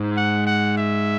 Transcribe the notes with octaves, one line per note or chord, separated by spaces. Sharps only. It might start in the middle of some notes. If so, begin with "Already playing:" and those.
Already playing: G#2
F#5
F#5
E5